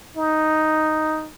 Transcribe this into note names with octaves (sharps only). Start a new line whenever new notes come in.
D#4